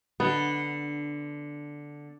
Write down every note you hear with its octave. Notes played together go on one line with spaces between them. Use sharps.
D3 B3